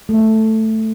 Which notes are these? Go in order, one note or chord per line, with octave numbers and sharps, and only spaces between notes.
A3